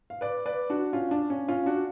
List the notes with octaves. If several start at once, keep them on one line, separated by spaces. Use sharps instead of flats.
F5
B4 D5
B4 D5
D4 F#4
C#4 F4
D4
C#4
C#4 F4
D4 F#4